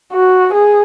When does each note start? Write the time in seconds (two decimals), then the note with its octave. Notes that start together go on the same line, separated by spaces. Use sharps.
0.13 F#4
0.53 G#4